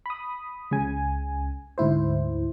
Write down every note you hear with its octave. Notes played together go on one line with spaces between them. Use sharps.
B5 D#6
C#2 C#3 G#5
D2 G#2 E4 C5